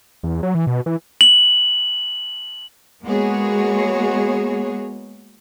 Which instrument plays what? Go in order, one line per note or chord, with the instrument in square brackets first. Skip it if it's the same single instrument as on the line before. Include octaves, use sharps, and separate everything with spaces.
[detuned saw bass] E2
F#3
E3
B2
E3
[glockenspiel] F#7
[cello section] G#3 A#3 B3 F#4 G#4 C#5